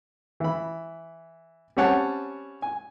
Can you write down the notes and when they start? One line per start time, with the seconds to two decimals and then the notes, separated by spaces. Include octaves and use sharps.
0.40 E3 B5
1.77 G3 C4 C#4 C#5 F#5 A5
2.62 G#5